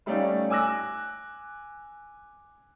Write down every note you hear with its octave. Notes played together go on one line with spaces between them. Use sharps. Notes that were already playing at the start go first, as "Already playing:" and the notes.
G3 A3 C#4 D#4 D5 F5
G#5 D6 E6 F#6 A#6